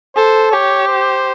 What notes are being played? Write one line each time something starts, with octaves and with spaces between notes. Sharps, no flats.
A4 C5
G4 C#5
C5